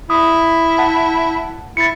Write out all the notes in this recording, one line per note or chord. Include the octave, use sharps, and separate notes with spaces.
E4 D#6
F#5 A5
E4 A6 C#7